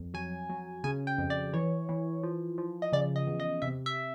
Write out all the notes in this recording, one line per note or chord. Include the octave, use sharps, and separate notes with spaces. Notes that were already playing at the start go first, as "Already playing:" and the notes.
Already playing: F2
F#3 G#5
F#3
C#3 G#5
G5
F2
D5
E3 C#5
E3
F3
F3
D#5
C#3 D5
D#5
E2
D#5
C3 E5
E5